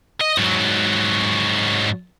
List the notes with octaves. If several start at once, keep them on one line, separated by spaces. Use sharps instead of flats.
D#5
G#2 F#3